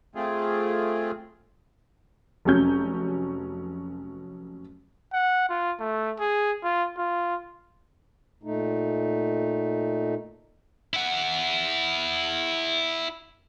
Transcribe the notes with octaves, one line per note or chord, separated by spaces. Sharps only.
A3 C4 F4 G#4
F1 F#3 C#4 G6
F#5
F4
A3
G#4
F4
F4
A#2 A3 D#4
E4 F#5